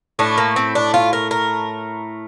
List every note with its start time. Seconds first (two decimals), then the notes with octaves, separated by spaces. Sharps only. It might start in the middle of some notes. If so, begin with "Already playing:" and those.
0.19 A2 A3 D4
0.38 A#3
0.56 C4
0.75 D4
0.94 F4
1.13 A#4
1.31 A#4